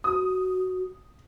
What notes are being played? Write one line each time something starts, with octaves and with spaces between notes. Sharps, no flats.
F#4 D#6